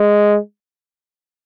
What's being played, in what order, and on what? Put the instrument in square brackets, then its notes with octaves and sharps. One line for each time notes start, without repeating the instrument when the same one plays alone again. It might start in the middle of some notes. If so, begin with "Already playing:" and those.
Already playing: [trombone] G#3